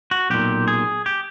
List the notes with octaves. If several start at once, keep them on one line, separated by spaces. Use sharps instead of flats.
F#4
B1 A#2 G4
G#4
G4